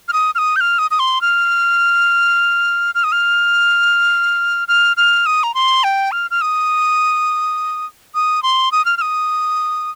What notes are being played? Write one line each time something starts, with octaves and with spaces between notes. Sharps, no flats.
F6
D#6
F6
D#6
G6
F6
D#6
D#6
C6
F6
F6
D#6
F6
F6
F6
D#6
A#5
C6
G5
F6
F6
D#6
D#6
C6
D#6
F6
F6
D#6